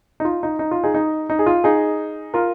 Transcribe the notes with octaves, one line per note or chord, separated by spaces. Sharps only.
D#4
F4
D#4
D#4
F4
D#4 G#4
D#4
D#4
G#4
F4
D#4 G#4
F4 A#4